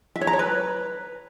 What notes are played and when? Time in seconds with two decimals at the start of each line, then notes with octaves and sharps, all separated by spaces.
0.16 E5
0.21 C#5
0.27 A#5
0.33 C#5
0.39 B4